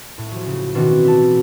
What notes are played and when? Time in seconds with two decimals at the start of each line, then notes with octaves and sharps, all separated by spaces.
0.18 A2
0.32 F3 F#3
0.46 C#3
0.74 B2 D#3 E3 C4 D4 F#4
1.05 E4 A5